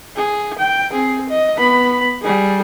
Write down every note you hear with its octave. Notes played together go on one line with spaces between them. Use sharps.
G#4
G5
C4 G#4
D#5
B3 B5
G3 G#4